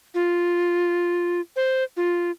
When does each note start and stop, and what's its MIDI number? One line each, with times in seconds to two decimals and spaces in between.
0.15 1.41 65
1.56 1.84 72
1.97 2.31 65